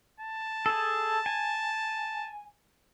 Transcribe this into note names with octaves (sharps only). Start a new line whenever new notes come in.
A5
G#4 A4
G#5